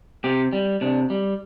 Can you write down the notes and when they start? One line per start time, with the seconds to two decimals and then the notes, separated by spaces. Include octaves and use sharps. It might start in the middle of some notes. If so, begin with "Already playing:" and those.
0.24 C3 G4
0.53 G3
0.81 C3 D4
1.10 G3